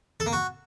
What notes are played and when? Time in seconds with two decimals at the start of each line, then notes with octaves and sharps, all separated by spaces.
0.20 A4
0.26 A#3
0.33 F#4